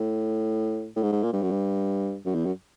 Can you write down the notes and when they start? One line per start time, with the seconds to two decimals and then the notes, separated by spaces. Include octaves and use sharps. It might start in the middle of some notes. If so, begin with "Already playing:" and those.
Already playing: A2
0.96 A2
1.02 G#2
1.12 G#2
1.23 A#2
1.33 G2
1.42 F#2
1.51 G2
2.25 F#2
2.35 E2
2.46 F#2